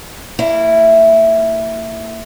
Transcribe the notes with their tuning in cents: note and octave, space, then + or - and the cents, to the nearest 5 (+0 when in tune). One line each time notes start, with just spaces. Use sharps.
A#3 -35 E4 +0